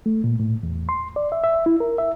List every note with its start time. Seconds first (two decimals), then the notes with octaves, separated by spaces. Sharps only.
0.06 A3
0.24 A#2
0.40 A2
0.63 E2
0.89 C6
1.16 D5
1.32 E5
1.44 E5
1.66 E4
1.80 A#4
1.98 E5